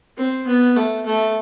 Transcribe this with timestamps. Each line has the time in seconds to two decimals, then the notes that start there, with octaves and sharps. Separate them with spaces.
0.17 C4
0.47 B3
0.76 A3
1.06 A3